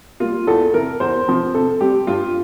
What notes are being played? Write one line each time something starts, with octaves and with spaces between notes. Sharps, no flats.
G3 A#3 F4
E2 A4
C3 E3 A#4
E2 C5
C3 F3 C4
C3 A4
G3 C4 G4
G2 F4